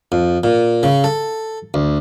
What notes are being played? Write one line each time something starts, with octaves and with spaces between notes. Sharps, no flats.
F2
A#2
C#3
A4
D2